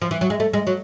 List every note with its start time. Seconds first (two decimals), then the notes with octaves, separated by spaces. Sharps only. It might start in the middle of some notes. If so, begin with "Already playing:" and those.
0.02 F3
0.11 E3
0.21 F#3
0.30 G#3
0.40 A3
0.53 G#3
0.67 F#3